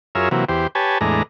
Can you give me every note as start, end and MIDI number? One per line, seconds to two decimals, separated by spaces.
0.15 0.29 42
0.15 0.29 65
0.15 0.29 68
0.15 0.29 70
0.15 0.29 73
0.15 0.29 76
0.31 0.45 48
0.31 0.45 52
0.31 0.45 54
0.31 0.45 58
0.49 0.67 40
0.49 0.67 67
0.49 0.67 72
0.75 0.98 67
0.75 0.98 71
0.75 0.98 73
0.75 0.98 80
0.75 0.98 81
1.01 1.23 40
1.01 1.23 45
1.01 1.23 56
1.01 1.23 62
1.01 1.23 82